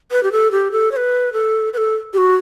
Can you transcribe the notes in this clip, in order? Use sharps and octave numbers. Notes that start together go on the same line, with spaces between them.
B4
G4
A4
G4
A4
C#5
B4
A4
B4
A4
G4
F#4